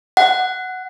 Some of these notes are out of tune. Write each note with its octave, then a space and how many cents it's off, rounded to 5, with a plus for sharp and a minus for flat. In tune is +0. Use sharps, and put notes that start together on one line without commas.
F#5 +5